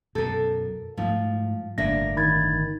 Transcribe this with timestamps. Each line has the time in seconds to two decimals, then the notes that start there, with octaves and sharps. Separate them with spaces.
0.15 F#2 B2 A4 A#4
0.97 G#2 F3 A3
1.78 G1 A2 D3 A#3 D4 E5 A#6
2.17 D#3 B5 G#6 A6